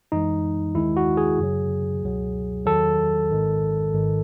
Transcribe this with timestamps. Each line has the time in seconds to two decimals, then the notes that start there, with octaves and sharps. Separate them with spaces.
0.12 F#2 E3 G#3 D#4
0.75 D#2 D#3 G#3 E4
0.97 F#4
1.17 G#4
1.39 F#2 C#3 F#3
2.02 C#2 B2 F#3
2.66 E2 D#3 F#3 A4
3.30 G#1 G#2 D#3 G#3
3.94 G#1 G#2 D#3